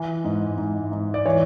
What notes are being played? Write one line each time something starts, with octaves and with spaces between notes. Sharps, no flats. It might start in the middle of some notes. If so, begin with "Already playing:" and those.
Already playing: E3
G#2
G#2
G#2
D5
E3 C#5